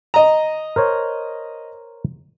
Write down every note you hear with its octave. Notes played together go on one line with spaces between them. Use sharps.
D#5 A#5
A#4 C5 C#5